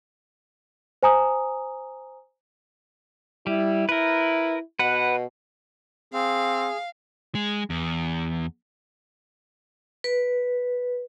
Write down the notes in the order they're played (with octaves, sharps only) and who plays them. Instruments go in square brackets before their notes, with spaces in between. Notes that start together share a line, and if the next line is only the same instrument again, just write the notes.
[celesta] C5 G#5 A#5 D#6
[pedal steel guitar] G3 [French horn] E4
[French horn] E4 [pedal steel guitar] A#4 B4
[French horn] B2 [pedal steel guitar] B4 F#5
[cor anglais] C4 [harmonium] G#4 [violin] F5
[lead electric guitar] G#3
E2
[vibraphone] B4